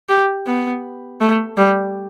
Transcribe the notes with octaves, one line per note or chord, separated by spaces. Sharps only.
G4
B3
A3
G3